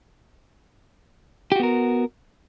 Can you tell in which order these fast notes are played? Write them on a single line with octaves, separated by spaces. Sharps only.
G4 F#4 B3 A#4